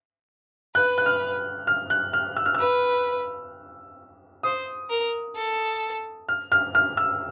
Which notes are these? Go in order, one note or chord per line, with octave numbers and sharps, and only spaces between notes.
B4 F#6
F#6
F6
F6
F#6
F6
E6
F6
E6
B4
C5 D#6
A#4
A4
F6
F6
F6
E6